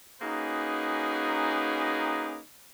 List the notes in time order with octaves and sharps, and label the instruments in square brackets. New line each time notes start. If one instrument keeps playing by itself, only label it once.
[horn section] A#3 C#4 D#4 F#4 G#4 B4